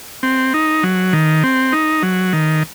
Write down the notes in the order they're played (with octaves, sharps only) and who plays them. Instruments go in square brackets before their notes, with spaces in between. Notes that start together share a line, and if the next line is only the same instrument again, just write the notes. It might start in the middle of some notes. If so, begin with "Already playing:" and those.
[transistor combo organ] C4
D#4
F#3
D#3
C4
D#4
F#3
D#3